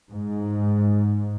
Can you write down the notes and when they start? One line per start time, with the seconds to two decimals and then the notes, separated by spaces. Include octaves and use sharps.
0.11 G#2